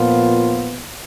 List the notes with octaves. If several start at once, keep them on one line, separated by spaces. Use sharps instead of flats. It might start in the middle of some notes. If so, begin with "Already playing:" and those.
Already playing: A#2 F3 B3 F4